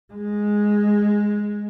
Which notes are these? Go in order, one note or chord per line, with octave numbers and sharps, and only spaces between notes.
G#3